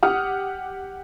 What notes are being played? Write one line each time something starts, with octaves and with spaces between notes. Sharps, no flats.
G4 F#5 D#6 F6